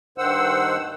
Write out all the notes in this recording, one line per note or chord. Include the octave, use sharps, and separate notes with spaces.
G2 D#3 C5 F#5 E6